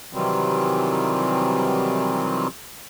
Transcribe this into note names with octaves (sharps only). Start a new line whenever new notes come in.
C3 D#3 E3 F#3 G3 C4